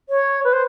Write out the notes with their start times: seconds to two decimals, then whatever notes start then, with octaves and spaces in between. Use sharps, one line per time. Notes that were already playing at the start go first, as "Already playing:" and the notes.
0.09 C#5
0.44 B4
0.53 C5